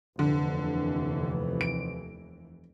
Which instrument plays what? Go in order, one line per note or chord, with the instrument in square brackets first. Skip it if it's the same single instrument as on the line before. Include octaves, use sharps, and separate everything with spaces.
[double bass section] F1 D#2 E3 [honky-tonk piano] D3
[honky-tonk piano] D7